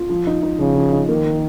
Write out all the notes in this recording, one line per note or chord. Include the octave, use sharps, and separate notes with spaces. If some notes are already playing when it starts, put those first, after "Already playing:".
Already playing: F4
F3
D#4
D#4
C#3 F3
F3
D#4
D#3 A#3
A#3